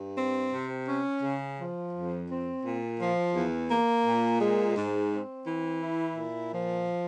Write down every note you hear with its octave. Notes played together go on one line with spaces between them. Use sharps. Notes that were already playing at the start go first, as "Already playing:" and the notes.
Already playing: G2
C4
C3
C#4
C#3
F3
F2
C4
A#2
F3
E2
A#3
A#2
G#3
G#2
C4
E3
E4
A#2
F3